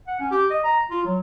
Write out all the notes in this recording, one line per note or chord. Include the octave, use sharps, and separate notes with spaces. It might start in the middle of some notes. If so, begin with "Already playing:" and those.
F#5
C#4
G4
D#5
A#5
F4
F#3